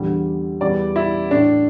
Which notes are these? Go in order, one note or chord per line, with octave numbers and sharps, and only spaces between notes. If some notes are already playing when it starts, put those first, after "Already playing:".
Already playing: E2 D3 G3
E2 E3 G3 D5
E4
A2 A3 D4